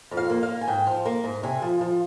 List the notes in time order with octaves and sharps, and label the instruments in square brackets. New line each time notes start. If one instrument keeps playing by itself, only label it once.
[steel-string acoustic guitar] F2
F5
A#3
F5
A#3
G#5
G#2 G5
F3
A#3
G#2
C3 G#5
F3
F3